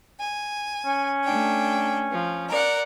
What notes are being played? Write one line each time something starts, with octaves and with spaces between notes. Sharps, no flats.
G#5
C#4
A3 D4 G5
F3
A#4 D5 F#5